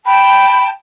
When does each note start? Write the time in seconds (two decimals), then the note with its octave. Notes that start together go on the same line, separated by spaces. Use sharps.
0.06 G5 A5 B5